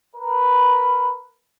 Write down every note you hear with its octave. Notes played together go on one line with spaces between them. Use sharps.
A#4 B4